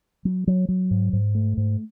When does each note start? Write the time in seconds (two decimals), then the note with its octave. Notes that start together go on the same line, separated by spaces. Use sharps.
0.25 F#3
0.47 F#3
0.68 F#3
0.91 G#2
1.13 G#2
1.35 A3
1.57 G#2